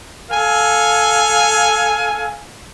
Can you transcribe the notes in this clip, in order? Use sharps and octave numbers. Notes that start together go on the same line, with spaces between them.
A4 F5 G#5